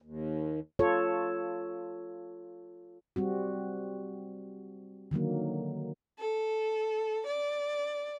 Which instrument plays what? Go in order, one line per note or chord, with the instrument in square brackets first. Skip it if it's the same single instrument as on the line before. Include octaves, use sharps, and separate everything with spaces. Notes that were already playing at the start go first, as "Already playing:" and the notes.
[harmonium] D#2
[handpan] F4 A4 C#5
G3 C4 F#4
D3 D#3 F#3 A#3
[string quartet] A4
D5